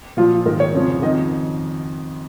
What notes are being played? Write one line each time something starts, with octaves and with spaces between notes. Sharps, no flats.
A#2 F3 F4
G#2 D#3 A#4
C#5
F2 C#3 F3
F2 D#3 D#5